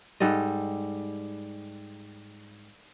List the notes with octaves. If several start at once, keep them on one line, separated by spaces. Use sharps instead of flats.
G#2 G3 A4 D#5